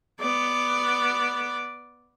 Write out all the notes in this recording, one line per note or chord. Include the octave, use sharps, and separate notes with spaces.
B3 D5